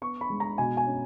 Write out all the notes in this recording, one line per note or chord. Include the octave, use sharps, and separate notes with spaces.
B3 C#6
B5
G#3
A#5
B2 G#5
G#5
C#4